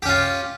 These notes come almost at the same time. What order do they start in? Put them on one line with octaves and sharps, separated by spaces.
G4 C#4 F4